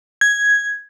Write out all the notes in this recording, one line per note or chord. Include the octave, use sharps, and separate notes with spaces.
G#6